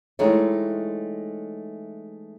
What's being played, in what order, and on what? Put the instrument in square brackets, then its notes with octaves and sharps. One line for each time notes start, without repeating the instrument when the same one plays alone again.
[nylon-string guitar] E3 G#3 A3 C4 D#4 C#5